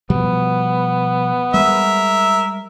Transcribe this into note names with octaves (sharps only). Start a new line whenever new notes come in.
B2 F3 G3 B3
G3 G#3 A#4 E5